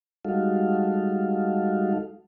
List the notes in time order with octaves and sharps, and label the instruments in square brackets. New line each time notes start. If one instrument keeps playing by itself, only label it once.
[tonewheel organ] G3 G#3 D#4 F#4 A4 F5